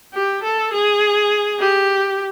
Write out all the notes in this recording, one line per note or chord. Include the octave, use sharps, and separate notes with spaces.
G4
A4
G#4
G4